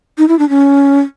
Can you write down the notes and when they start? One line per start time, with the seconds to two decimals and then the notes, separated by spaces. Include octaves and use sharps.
0.18 D#4
0.28 E4
0.39 D4
0.49 C#4